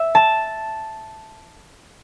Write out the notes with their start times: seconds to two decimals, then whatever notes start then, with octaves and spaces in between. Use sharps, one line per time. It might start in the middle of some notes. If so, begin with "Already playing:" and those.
Already playing: E5
0.15 A5